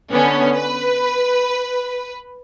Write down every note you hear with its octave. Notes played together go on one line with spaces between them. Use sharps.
D3 B3 C#4 D4
B4